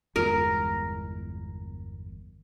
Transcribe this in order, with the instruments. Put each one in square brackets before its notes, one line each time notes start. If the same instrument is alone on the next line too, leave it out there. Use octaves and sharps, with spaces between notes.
[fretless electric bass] G1 E2 G#3 [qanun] A#4